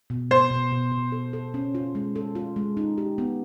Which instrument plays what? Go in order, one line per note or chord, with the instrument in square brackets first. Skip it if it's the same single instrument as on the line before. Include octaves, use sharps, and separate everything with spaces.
[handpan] B2
[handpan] B3 [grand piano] C5
[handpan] B2
B2
B2
A4
A4
C#4
F4
G#3
A4
F4
G#3
D#4
G4
B3